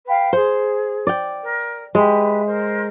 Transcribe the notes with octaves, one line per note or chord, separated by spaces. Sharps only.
B4 F5 G5
G#4 C5
D5 G5
A#4
G#3 G4 B4 E5
A#4 C5